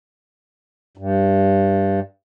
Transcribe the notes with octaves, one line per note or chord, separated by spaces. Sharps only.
G2